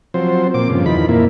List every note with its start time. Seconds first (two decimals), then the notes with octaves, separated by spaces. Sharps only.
0.14 F3 F#3 C4 C5
0.54 A#2 C4 D6
0.69 G2 C#3 F3
0.86 E2 D#3 F3 B5
1.09 F2 A#2 A#3 E4